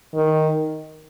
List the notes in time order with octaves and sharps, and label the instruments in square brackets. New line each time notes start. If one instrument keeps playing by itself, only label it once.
[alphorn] D#3